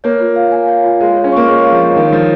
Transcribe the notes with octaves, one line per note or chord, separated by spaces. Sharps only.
A#3 C#5
F4
F5
G#5
C#5
F4
G#3 F5
G#3 C#5
C#4
A#3 C#6
G#3 C#5
F5
F3
C#5
D#3 C#5
F3 A#4